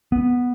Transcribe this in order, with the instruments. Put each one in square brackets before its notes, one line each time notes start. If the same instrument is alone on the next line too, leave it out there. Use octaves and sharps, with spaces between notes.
[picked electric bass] B3